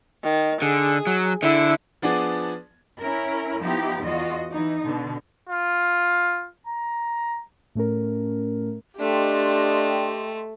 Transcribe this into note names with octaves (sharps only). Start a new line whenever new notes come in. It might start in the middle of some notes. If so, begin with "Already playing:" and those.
D#3
D3 G#4
F#3
D3 E4
F3 B3 D4 G#4 D5
C#4 E4 A#4
F3 B3 D#4 E4 G4
E2 F4 F#4 D#5
E3 D#4
B2 D3
F4
A#5
A2 A3 C#4 A#4
A3 D4 G4 D#5 G5 C6